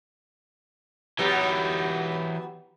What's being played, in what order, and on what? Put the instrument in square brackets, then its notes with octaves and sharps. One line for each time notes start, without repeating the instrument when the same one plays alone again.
[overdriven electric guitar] E3 D#4 [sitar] F#3 B3 G4